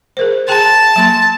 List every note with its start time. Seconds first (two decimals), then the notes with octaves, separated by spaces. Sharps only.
0.17 G#4 A#4 C5
0.48 G#4 G5 A5 C6
0.96 F#3 A#3 C6